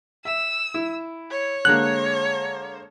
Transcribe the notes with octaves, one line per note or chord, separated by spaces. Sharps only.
E5 E6
E4
C#5
D3 G#3 A#3 F#6